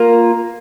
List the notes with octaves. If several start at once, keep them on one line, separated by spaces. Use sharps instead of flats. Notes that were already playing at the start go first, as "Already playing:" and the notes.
Already playing: A#3 F4 A#4